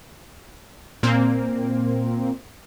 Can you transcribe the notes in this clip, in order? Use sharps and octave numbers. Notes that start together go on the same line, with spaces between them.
A#2 A#3 C4